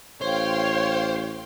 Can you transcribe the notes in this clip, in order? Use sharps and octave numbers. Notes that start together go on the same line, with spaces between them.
A1 C5 C#5 F5 G5 C6